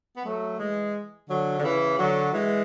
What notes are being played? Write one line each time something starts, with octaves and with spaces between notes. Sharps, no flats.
B3
F#3 A3
E3 G#3
D3 F#3
D3
C#3 E3
D3 F#3
E3 G#3